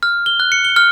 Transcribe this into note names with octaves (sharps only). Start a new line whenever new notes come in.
F6
G7
F#6
C#7
G7
F6